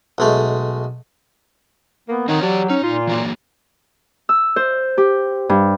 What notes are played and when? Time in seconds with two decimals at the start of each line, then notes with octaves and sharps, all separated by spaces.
0.18 B1 G#3 A3
2.09 A#3 B3
2.28 D#3 C4 D#4 C#5 F#5
2.42 E3 F#3 G4 D5
2.70 C#4 D#4
2.84 A#2 F4
3.07 E3 F#3 A#3
4.29 E6
4.56 C5
4.98 G4
5.49 G2